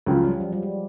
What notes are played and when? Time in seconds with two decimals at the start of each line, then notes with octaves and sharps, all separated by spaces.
0.06 C#2 C#3 F3 F#3
0.24 G3
0.40 F3
0.53 G3
0.63 G#3